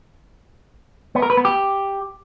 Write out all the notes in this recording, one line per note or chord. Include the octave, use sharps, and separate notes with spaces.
B3
A#4
B4
B3
G4